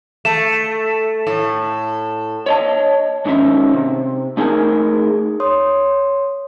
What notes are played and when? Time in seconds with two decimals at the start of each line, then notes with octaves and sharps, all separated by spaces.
0.25 A3 E7
1.27 A2
2.46 C#5 D#5 A5
3.25 G#2 D#3 C#4 D#4 E5
3.73 C3
4.37 A3 D#4 G#4 A#4 G#5
5.40 C#5 C6 D#6